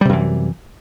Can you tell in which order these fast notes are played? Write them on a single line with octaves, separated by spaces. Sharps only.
G3 C3 F#2 E3